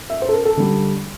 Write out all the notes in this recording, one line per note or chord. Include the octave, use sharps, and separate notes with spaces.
E5
C5
A4
A#4
A4
D3 G3